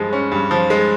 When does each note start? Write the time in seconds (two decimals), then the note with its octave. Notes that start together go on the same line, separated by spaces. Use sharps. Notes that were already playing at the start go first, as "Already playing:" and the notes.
Already playing: G2 F3 G#3
0.13 C#4
0.32 G2
0.51 F3
0.70 G#3